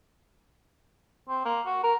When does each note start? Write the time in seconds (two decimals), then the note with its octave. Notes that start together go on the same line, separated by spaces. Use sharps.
1.29 C4
1.45 A#3
1.65 F#4
1.83 A#4